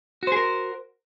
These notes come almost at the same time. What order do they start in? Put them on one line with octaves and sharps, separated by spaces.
F#4 C5 G#4 A#4